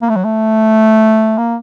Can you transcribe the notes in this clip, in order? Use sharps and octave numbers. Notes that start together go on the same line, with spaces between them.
A#3
A3
F#3
A3
A#3